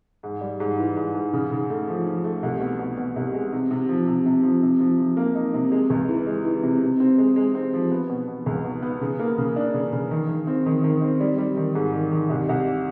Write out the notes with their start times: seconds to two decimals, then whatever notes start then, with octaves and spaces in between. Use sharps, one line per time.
0.23 G#2
0.41 G3
0.60 G#2
0.78 E3
0.97 G#2
1.15 G#2
1.33 C#3
1.51 C#3
1.70 A3
1.88 F3
2.06 F3
2.24 A3
2.43 C2
2.61 B2
2.79 B2
2.98 B2
3.16 C2
3.34 G#3
3.53 C3
3.71 C3
3.89 F3
4.07 C3
4.26 C3
4.43 F3
4.63 C3
4.80 F3
4.99 F3
5.17 A#3
5.35 D#4
5.54 C3
5.72 G#3
5.90 C#2
6.09 E3
6.27 G#3
6.45 E3
6.63 C3
6.82 C3
7.00 C4
7.18 G#3
7.36 G#3
7.55 C4
7.74 F3
7.92 B3
8.10 B2
8.28 B2
8.46 C#2
8.65 B2
8.82 B3
9.01 C#3
9.19 A#3
9.38 C#3
9.56 D4
9.74 C#3
9.93 C#3
10.11 D#3
10.29 D#3
10.47 C4
10.66 D#3
10.84 D#3
11.02 C4
11.20 G3
11.38 G3
11.57 D#3
11.75 G#2
11.94 D#3
12.12 D#3
12.30 C2
12.49 C2